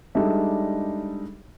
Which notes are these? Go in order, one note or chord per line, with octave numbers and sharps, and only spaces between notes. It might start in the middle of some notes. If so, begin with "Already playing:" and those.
G3 G#3 D4 D#4 A4 E5